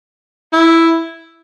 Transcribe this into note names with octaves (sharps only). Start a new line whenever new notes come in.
E4